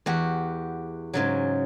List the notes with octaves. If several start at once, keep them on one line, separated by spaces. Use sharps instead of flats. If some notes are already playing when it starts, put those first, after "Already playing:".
E2 F#4 G4
G#2 C#3 F#3